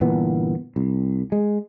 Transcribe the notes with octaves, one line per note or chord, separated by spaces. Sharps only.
G1 A#2 E3 B3
C2
G#3